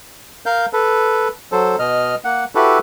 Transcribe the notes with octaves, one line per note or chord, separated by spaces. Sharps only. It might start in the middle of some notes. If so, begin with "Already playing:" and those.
A#4 F5 G6
A4 B4
F#3 A4 C5
B2 D#5 F6
A#3 F#5
E4 F#4 G4 A4 B4